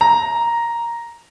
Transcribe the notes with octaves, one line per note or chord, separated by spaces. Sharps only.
A#5